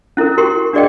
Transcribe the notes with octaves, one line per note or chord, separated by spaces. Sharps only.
C#4 E4 A4 A#4
F#4 G4 A#4 G5 C6
D4 F#4 G#4 D5 D#5 G5